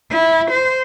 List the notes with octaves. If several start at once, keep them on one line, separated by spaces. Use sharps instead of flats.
E4
C5